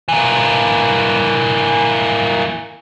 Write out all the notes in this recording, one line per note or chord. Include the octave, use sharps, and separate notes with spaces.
E3 A#3